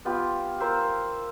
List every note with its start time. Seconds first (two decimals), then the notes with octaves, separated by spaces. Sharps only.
0.05 B3 F4 G4
0.60 A#4 C5 E5 F5